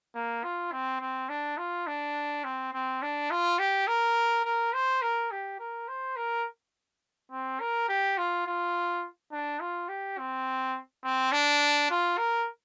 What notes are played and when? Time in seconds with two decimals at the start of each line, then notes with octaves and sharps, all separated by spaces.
0.15 A#3
0.44 F4
0.72 C4
1.01 C4
1.29 D4
1.58 F4
1.87 D4
2.44 C4
2.73 C4
3.02 D4
3.31 F4
3.59 G4
3.87 A#4
4.45 A#4
4.73 C5
5.02 A#4
5.31 G4
5.60 A#4
5.88 C5
6.16 A#4
7.31 C4
7.60 A#4
7.88 G4
8.18 F4
8.47 F4
9.32 D4
9.61 F4
9.89 G4
10.18 C4
11.04 C4
11.32 D4
11.90 F4
12.18 A#4